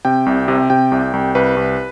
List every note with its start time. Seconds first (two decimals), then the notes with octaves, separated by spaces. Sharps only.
0.05 C3 G5
0.26 C2
0.48 C3
0.70 C3 G5
0.92 C2
1.13 C2
1.35 C2 B4
1.57 C2